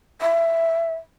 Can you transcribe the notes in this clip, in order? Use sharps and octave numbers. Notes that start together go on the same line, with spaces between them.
E5